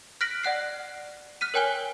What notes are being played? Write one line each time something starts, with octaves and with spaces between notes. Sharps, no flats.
F6 F#6 A#6 B6 D7 F#7
D5 F#5 F#6 C7
F6 F#6 B6 D#7
A#4 C#5 G5 G#5 F#6 G7